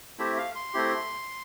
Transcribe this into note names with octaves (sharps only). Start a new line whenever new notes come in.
A3 C4 E4 G4 E5
F5
C6
A3 C4 E4 G4